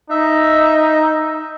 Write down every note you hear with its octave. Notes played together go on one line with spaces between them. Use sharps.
D#4 E5